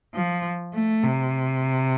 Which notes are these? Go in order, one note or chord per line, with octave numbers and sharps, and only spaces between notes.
F3
A3
C3